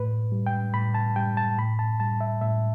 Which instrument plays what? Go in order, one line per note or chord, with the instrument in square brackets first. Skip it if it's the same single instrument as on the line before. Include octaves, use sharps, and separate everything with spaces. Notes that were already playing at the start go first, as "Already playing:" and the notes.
Already playing: [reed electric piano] A2 B4
G3
G5
A2 B5
A5
G3 G5
A5
A2 B5
A5
G3 A5
E5
A2 E5